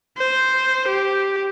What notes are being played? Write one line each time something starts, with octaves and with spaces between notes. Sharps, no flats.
C5
G4